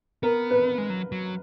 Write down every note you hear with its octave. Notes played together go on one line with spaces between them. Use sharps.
B3 A#4
B4
G#3
F#3
F#3